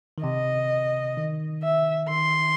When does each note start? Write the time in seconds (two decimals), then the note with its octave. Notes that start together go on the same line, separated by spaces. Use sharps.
0.18 D#3
0.23 C3 D#5
1.17 D#3
1.63 E5
2.09 D#3 C6